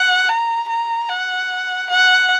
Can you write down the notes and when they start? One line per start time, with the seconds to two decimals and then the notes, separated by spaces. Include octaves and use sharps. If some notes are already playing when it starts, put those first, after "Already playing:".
Already playing: F#5
0.29 A#5
0.68 A#5
1.09 F#5
1.89 F#5